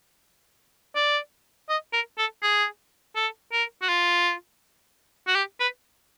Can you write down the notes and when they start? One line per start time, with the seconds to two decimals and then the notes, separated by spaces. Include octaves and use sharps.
0.96 D5
1.69 D#5
1.93 A#4
2.18 A4
2.43 G#4
3.16 A4
3.52 A#4
3.82 F#4
3.89 F4
5.27 F#4
5.35 G4
5.60 B4